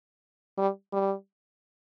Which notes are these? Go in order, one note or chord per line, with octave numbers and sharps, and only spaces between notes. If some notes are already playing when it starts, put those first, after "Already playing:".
G3
G3